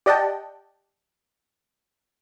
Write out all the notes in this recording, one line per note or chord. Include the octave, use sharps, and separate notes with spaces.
G4 D5 D#5 F#5 G5 A5